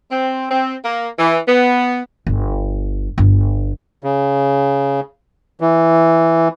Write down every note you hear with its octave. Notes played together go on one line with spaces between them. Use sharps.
C4
C4
A#3
E3
B3
G1
G1
C#3
E3